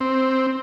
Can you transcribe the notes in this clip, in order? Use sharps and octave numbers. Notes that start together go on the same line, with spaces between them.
C4